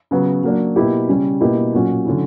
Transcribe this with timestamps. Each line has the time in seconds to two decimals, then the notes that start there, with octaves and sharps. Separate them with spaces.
0.11 C#3 F#3 B3
0.44 F#3 A#3 D4
0.76 B2 A#3 E4 G4
1.08 C#3 G3 C#4
1.41 B2 A#3 E4 G4
1.73 A#2 F#3 C#4 F#4
2.06 D3 F#3 C#4 E4